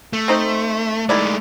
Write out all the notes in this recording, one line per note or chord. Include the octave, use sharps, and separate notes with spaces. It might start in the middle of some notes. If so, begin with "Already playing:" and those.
A3
C4 D#4 C5
D#3 G#3 A3 E4 D5